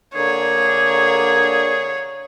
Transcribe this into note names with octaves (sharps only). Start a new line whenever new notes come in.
D3 A#3 G#4 C#5